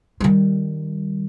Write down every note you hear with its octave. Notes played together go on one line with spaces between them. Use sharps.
D#3 G3